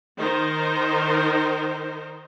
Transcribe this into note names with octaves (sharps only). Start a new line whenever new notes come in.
D#3 D#4 A#4 C5